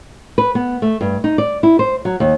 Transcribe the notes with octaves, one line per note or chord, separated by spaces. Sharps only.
B4
B3
A3
G2
D#4
D5
E4
C5
F#3
D#2